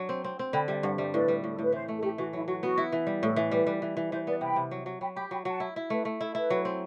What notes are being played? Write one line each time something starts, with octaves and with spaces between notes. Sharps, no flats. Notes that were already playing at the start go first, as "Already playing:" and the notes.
Already playing: F#3 D4
C4
C4
C4
D3 G5 B5
G3 E5 G5
G2 D5 F#5
G3 C5 E5
A2 B4 D5
G3
A2
A4
A2 B4
E3 C5
A3
A4
A3 G4
E3 F#4
F#3 E4
F#3 F#4
B3 F#4
E4
E3
G3
A2 A4
E3
G3 B4
G3
E3
E3
E3 C5
B3 B4 D5
C3 G5 B5
C3
F#3
F#3
F#3 G5 B5
G4 G5 B5
F#3 G5 B5
F#3 F#5 A5
E4
E4
A3 B4
A3
E4 A4
E4 B4
F#3
C4